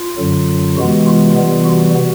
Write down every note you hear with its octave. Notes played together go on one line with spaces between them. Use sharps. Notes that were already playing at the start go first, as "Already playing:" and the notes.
Already playing: F4
F#2 D3 F#3
C3 E3 G#3 B3 F#4
F4
C3 E3 G3 B3
F#4